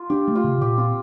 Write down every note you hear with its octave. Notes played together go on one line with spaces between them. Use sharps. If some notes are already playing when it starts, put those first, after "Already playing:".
Already playing: F4
D4 G4
A3
F4
C3
A#2 G4
C4 F4